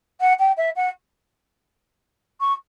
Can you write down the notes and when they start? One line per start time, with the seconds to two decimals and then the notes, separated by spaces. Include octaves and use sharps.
0.21 F#5
0.39 G5
0.57 E5
0.76 F#5
2.41 C#6